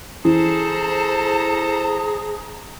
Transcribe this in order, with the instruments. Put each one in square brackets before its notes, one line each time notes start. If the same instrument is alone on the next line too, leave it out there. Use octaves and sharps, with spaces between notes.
[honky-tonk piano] E3 [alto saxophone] G#4 [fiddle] A4 C5 [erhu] A#5